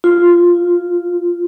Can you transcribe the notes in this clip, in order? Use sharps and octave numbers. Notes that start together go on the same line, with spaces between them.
F4